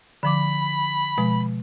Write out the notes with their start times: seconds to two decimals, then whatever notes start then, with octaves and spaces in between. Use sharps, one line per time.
0.23 D3 F3 B5 D6
1.18 B2 F3 G#3